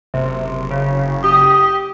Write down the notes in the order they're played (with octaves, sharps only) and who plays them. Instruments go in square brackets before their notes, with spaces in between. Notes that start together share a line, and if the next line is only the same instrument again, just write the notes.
[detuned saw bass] F#1 [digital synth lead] C3
[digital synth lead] C#3
[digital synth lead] G4 [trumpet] D#6